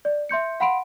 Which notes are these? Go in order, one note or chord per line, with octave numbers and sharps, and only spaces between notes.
D5
E5 C6 G6 C#7
F5 F#5 B5 C6 D7